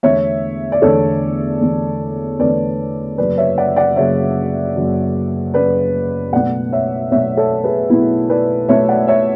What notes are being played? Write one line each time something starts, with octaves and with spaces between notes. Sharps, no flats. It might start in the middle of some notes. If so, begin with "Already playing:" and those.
E2 D3 A3 C#5 E5
D5
E2 D3 A3 A4 C#5
E2 D3 A3
E2 D3 A3 B4 D5
F#1 F#2 C#3 B4 D5
C#5 E5
D5 F#5
D5 F#5
F#1 F#2 C#3 C#5 E5
F#1 F#2 C#3
F#1 F#2 C#3 B4 D5
B1 B2 A3 D5 F#5
C#5 E5
B1 B2 A3 C#5 E5
A4 C#5
G#4 B4
B1 B2 A3 E4
B4 D5
B1 B2 A3 C#5 E5
D5 F#5
C#5 E5